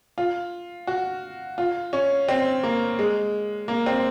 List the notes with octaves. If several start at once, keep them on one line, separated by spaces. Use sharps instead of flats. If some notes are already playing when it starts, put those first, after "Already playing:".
F4
F#4
F4
C#4
C4
A#3
G#3
A#3
C4